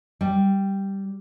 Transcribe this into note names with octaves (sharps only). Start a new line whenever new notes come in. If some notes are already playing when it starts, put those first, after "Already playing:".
G3